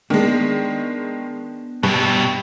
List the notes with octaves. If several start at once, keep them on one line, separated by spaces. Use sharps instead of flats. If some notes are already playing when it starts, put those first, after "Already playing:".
D#3 G#3 B3 D4
G2 B2 G3